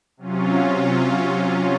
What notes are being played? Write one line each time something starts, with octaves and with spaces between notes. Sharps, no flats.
C3 F#3 C#4 F4